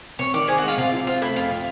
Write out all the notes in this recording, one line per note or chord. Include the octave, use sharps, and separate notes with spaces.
C3 C#5
D#3 D5
C4 G#4
F#4
G#3 F4
C3 F4
F3
C4 F4
A3 E4
F2 F4
C3